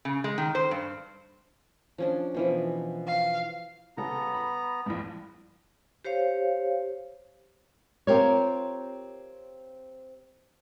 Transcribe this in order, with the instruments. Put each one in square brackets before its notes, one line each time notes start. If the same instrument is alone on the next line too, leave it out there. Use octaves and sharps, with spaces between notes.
[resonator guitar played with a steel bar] C#3
G#3
D#3
C5
G2
[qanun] F3 C#4 D4
B2 E3 F3
[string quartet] F5
[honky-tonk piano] C#3 G3 A4 [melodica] B3 A#5
[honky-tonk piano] B5
A#1 E2 G2
[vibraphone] G4 C5 C#5 F5
[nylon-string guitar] C4 F4 G4 A#4 C5 C#5